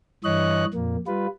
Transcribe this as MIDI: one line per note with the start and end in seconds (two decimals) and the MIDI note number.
0.24 0.65 43
0.24 0.65 52
0.24 0.65 73
0.24 0.65 75
0.24 0.65 90
0.74 0.97 41
0.74 0.97 46
0.74 0.97 58
1.07 1.27 55
1.07 1.27 65
1.07 1.27 71